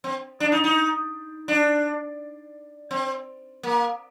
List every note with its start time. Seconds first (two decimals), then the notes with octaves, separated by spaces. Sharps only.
0.04 C4
0.40 D4
0.52 D#4
0.64 D#4
1.48 D4
2.91 C4
3.63 A#3